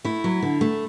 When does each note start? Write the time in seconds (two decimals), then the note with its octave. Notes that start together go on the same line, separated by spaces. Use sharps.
0.04 A3 E4
0.24 F#3
0.42 D3
0.61 A3